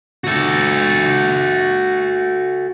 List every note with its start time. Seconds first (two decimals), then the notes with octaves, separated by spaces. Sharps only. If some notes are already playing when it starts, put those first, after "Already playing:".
0.24 F#4 A4